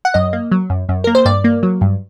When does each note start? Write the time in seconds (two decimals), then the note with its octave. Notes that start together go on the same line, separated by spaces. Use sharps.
0.05 F#5
0.14 F#2 D#5
0.33 A#3
0.52 F#3
0.70 F#2
0.89 F#2
1.04 A#3 A#4
1.15 C5
1.25 G2 D5
1.44 A#3
1.63 F#3
1.81 G2